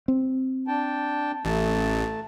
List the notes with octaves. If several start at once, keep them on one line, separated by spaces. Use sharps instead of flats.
C4
D4 G5 A5
A1 A3 A5